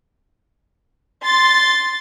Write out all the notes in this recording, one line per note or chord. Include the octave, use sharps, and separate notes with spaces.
C6 A6